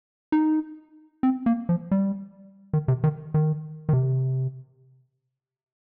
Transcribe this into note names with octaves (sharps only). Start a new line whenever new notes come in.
D#4
C4
A#3
F3
G3
D#3
C3
D#3
D#3
D#3
C3